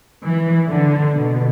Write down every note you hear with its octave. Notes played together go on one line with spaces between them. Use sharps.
E3
D3
B2